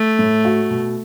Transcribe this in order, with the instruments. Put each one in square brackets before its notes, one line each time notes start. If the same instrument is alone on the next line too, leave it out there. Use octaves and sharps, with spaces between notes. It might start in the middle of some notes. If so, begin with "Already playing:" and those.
Already playing: [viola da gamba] A3
[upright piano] A2
F#4
B2